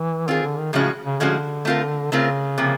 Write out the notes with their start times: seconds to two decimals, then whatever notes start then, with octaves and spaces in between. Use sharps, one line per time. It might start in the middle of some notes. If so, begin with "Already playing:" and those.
Already playing: E3
0.28 D#3 C4 F4 G#4
0.43 D3
0.58 D#3
0.73 A2 C#3 F3 G#3 C#4 F#4
1.04 C#3
1.19 A2 D3 F3 G#3 C#4 F#4
1.65 A3 C4 F4 A#4
2.11 C#3 A3 C4 F4 A#4
2.58 C3 F3 A#3